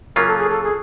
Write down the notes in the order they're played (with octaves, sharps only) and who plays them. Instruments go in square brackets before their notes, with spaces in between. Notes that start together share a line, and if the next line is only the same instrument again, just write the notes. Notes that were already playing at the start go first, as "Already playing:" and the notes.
[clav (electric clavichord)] C#3 F#3 A#3 C#4 F4 [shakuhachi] A#4
[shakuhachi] A4
G#4
A4
G#4